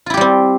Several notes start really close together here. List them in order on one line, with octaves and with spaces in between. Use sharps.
F4 E4 G4 G3 C4